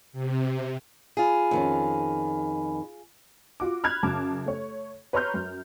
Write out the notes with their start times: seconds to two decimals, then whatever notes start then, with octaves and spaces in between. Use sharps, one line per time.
0.13 C3
1.17 F4 G#4 G#5 B5
1.51 F2 D#3 C#4
3.60 F4 F#4 D6
3.84 B5 F6 F#6 G#6
4.03 F#2 C#3 A5 D6
4.46 A3 C#5
5.13 B4 C#5 A#5 C6 F6 G6
5.34 F#2